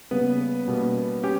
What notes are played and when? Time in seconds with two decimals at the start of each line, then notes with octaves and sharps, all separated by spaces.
0.11 C#3 G3 A#3 B3 B4
0.68 B2 G3 A#3 C#4
1.23 C#4 G4